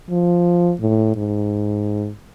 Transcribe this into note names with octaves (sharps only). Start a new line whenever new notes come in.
F3
A2
G#2